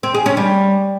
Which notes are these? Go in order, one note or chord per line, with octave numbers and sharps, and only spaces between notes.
C4
G#4
C#4
G3